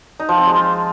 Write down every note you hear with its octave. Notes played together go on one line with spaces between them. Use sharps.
D#4
F3
C4
G#3
F4